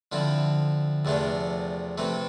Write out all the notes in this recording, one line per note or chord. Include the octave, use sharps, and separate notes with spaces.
D3 F3 C4 E4
E2 C3 F3 A3 D4
C3 E3 A3 C4